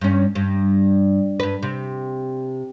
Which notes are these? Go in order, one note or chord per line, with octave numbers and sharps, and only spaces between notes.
G2 C#4
G2
G2 B4
C3